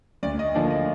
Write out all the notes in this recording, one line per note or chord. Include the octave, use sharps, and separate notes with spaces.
D2 D5
D#5
D3 F3 A#3 D4 D5
D#5